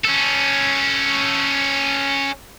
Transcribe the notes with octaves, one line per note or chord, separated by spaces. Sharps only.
C#4 A4